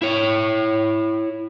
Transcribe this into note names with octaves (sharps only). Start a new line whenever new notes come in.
E4 C#5